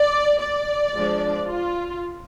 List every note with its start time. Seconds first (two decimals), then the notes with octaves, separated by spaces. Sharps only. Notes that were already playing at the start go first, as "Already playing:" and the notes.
Already playing: D5
0.41 D5
0.93 F3 G#3 D4
1.47 F4